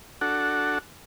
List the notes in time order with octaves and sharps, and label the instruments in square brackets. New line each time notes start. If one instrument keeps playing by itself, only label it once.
[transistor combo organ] D4 F#4 A4 F#5